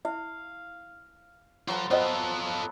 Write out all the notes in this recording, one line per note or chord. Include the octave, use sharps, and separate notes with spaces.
E4 E5 F5
F#3 F4 A4 B4 C5
F3 F#3 B3 F4 A4 C5 D#5 G#5